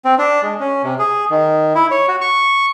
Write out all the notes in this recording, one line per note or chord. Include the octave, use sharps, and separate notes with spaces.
C4
D4
G#3
C#4
C3
G#4
D#3
E4
C#5
F#4
C#6